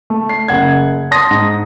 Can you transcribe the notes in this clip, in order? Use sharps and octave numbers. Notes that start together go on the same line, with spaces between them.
A3
C7
F#1 F#5 G#6
A5 C6 D#6 A#6
G#2